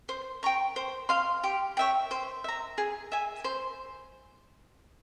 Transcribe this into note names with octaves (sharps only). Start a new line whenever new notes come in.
C5
G5 A#5 C#6
C5
F5 C6
G4
C#5 E5 G5
C5
E5 A#5
G#4
E5 G#5
C5